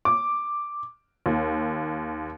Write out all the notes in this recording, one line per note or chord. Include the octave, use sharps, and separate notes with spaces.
D6
D#2